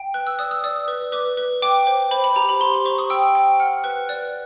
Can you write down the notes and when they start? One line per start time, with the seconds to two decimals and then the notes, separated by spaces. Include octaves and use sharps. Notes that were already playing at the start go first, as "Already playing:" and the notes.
Already playing: G5
0.14 B4 F#6
0.27 E6
0.39 D5 D#6
0.51 E6
0.64 D5 D#6
0.88 B4
1.12 B4 D6
1.37 B4
1.62 G5 D6
1.87 C5
2.11 C5 B5
2.24 B5
2.36 G4 A#5
2.49 B5
2.61 G4 C6
2.73 C6
2.85 C5 C#6
2.98 D#6
3.10 G5 E6
3.35 G5
3.60 F#5 F6
3.84 B4 F#6
4.09 D5 F#6